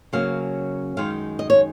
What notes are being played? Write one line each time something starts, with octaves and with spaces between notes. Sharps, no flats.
C#3 F#3 A#3 C#4 F5
F#2 D#3 G#3 D#4 F5
D#5
C#5